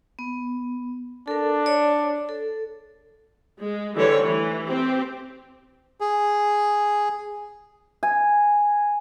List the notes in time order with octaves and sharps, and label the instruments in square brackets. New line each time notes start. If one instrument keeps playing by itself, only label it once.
[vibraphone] B3
[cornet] D4 [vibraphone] A4 A#4
[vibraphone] C#5 D5
A4
[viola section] G#3
D3 E3 G3 A3 C5 C#5
E3
C4 G4
[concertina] G#4
[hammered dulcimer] G#5